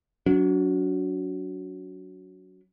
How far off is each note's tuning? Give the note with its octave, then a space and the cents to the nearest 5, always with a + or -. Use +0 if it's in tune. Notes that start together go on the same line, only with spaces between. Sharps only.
F#3 +0 D4 -40